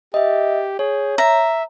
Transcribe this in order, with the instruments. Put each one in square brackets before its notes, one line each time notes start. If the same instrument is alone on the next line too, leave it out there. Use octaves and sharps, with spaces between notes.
[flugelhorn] G4 [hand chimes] D#5 E5
[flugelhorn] G#4 [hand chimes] C#5
[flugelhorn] E5 [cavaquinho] A#5